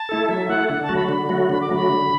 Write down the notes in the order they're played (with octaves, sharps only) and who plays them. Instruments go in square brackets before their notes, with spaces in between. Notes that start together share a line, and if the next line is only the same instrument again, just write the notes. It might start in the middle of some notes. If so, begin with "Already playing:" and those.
Already playing: [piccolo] A5
[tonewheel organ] A3 E4 A4
[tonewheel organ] F#3 [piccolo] E5
[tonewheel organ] A3 E4 A4 [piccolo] F#5
[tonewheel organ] D3 [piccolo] F#5
[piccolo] A5
[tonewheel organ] F#3 A3 F#4
[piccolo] B5
[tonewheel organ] D3 [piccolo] B5
[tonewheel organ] F#3 A3 F#4
[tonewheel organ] D3 [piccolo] B5
[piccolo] D6
[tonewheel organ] F#3 A3 F#4 [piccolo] B5
[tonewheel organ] D3